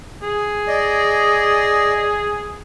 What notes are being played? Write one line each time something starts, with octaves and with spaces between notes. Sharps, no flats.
G#4
D5 D#5